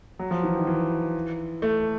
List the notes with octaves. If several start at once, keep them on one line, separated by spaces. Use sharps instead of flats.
F#3
F3
E3
D#3
E3
A3